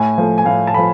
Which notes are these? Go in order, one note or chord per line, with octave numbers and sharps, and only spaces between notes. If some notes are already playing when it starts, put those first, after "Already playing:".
Already playing: A2 G#5
F3 A3
G#5
A2 F5
A5
F3 A3 B5